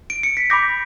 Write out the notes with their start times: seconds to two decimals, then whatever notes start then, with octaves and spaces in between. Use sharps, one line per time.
0.10 D7
0.23 C#7
0.37 B6
0.50 B5 D6 G6 A#6